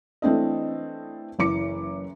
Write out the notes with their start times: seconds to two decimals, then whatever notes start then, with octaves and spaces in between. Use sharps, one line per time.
0.22 E3 A3 C4 D4 D#5
1.39 F#1 E3 D6 C#7